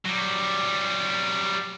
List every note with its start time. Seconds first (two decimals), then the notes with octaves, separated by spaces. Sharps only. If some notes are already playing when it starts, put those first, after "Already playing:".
0.05 F#3 G3